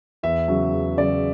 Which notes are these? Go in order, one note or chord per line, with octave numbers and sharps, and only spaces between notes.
E2 E5
C#3 F#3
E2
C#3 F#3 D5